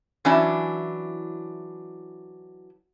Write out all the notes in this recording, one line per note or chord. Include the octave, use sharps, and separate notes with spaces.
E3 F#3 C#4 D4 E4